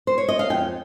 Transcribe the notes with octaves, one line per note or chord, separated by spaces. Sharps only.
C5
C#5
D#5
F5
F2 G5